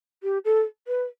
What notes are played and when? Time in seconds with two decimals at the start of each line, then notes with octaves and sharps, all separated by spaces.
0.23 G4
0.45 A4
0.88 B4